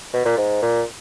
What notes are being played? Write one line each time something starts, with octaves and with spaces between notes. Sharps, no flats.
B2
A#2
G#2
A#2